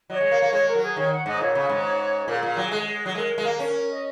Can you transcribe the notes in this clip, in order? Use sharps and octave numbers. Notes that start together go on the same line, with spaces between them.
F#3 C#5 D#5
G#3
A#3
A#3
G#3 C#5
A#4
F#3
G#4
D#3 C#5
F#5
G#2 D#5
A#2 C#5
C#3
G#2
A#2 G#4 A#4
A#2
F#3
G#3
F#3
G#3 A#4
G#3
A#3
C#4
D#5